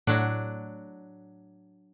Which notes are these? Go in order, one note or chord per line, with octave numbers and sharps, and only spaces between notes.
A2 F#3 D4 F#5